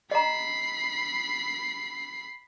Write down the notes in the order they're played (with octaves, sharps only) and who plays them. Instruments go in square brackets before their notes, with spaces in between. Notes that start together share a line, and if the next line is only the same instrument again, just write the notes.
[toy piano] D#5 A#5 [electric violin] B5 C7